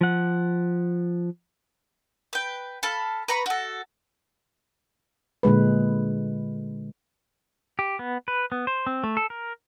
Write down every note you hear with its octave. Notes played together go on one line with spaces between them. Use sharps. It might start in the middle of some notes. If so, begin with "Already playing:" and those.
F3 F#5
B4 G5
A4 F5 A5 B5
B4 A#5 B5 C#6
F#4 A4
A#2 D3 G#3 B4
G4
B3
B4
B3
C5
C4
A3
A4
A#4